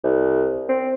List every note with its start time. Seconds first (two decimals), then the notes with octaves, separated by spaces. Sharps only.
0.03 C2
0.69 C4